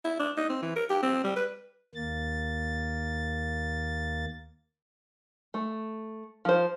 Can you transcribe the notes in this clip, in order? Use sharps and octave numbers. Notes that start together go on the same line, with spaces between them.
E4
D4
D#4
C4
E3
A#4
G4
C4
G3
B4
D#2 A#3 A6
A3
F3 C5